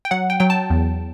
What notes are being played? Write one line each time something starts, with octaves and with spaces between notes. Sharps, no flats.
G5
F#3 F#5
G5
F#3 G5
A5
E2